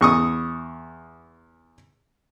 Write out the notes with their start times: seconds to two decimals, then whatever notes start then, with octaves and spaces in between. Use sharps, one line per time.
0.01 E2 C#6 D#6